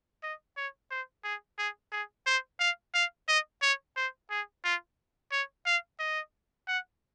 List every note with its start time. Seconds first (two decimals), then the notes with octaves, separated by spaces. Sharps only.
0.23 D#5
0.57 C#5
0.91 C5
1.24 G#4
1.58 G#4
1.92 G#4
2.27 C5
2.60 F5
2.94 F5
3.28 D#5
3.62 C#5
3.97 C5
4.30 G#4
4.64 F4
5.32 C#5
5.66 F5
5.99 D#5
6.68 F#5